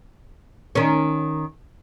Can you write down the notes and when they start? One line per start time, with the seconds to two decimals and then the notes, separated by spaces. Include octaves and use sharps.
0.75 D#3 C#4